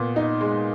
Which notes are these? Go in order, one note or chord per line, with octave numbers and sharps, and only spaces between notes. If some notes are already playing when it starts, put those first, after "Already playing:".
Already playing: A#2 B3
D#4
G#3